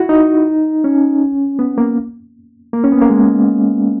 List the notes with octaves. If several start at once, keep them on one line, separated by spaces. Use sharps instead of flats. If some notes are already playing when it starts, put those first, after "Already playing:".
Already playing: E4 F#4
D#4
C#4
B3
A#3
A#3
C#4
B3
A#3
G#3